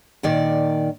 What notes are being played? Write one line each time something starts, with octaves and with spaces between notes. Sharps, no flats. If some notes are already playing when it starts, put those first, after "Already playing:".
A#2 D#3 D5